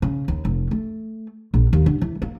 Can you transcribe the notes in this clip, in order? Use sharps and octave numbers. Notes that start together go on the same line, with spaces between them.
C#3
D#2
F1
A3
A#1
D#2
D3
E3
A#3